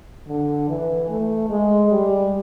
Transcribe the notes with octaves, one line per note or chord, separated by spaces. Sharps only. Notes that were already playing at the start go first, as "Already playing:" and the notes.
D3
E3
A3
G#3
G3